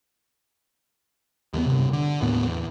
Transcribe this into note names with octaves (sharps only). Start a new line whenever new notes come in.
D#2 G#3 B3
G2 C3
D3
D#2 A2 B3
E2